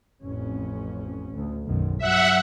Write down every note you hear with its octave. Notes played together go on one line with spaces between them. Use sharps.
A1 F2 C#4
D2
B1 F#2 D#3
G2 F#3 E5 F#5